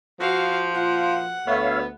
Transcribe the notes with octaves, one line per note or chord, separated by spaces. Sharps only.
F3 F#4 F5
A#2 F4 F#5
D2 A3 B3 C#5 E5 F5